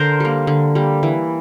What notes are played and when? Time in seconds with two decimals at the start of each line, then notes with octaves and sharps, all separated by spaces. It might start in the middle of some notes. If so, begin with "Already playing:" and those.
Already playing: D3 A#4 C5
0.20 G3 A#3
0.47 D3
0.75 G3 A#3
1.03 E3